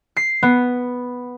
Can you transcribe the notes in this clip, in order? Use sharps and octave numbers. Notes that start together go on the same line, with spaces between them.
C7
B3